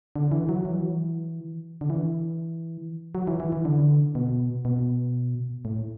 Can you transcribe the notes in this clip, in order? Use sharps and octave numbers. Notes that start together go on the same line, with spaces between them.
D3
E3
F#3
E3
F#3
E3
D3
E3
F#3
E3
E3
E3
D3
B2
B2
A2